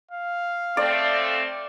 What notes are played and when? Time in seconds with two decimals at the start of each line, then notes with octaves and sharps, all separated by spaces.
0.12 F5
0.77 A3 C4 D5